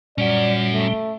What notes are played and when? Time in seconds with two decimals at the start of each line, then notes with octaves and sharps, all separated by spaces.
0.18 A#2 G3 C#4 F#4 D5
0.72 A3